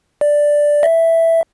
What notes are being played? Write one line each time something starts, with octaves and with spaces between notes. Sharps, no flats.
D5
E5